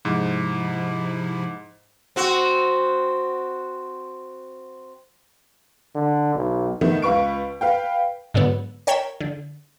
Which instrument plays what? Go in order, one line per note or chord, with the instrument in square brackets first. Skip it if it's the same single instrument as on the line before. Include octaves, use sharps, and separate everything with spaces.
[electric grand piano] G#2 [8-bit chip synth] C3 F3 E4
[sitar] C4 F#4
[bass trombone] D3
B1
[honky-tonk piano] D#3 A3 B3
C#2 F4 B4 C#6 D7
B4 F5 G5
[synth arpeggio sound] G#2 D3 F#3 B3
A#4 C#5 G5 G#6 B6 E7
D3